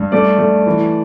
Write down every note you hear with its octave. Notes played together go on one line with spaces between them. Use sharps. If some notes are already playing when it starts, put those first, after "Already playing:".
Already playing: G2
A3 D5
A3
E3